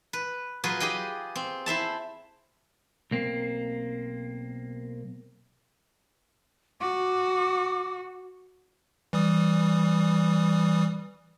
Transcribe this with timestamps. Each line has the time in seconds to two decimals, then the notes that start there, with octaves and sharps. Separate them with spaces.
0.13 B4
0.64 F#3 F4 G#4 B4
0.80 G4 G#4 D#5 G5
1.36 C4
1.66 E4 C5 E5 A5
3.11 B1 A#3 C4
6.81 F#4 D6
9.13 E3 G3 D#6